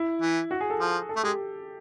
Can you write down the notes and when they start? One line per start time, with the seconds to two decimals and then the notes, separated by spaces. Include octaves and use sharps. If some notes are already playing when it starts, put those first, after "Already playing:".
Already playing: E4
0.22 E3
0.51 F#4
0.61 G#4
0.70 A4
0.80 F3
1.09 A4
1.16 A3
1.23 G#3 G4